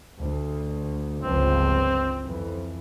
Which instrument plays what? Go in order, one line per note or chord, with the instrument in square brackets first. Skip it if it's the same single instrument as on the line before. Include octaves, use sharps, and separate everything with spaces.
[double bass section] D2
[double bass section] G1 C#2 F3 [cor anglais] C4
[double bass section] F2 E3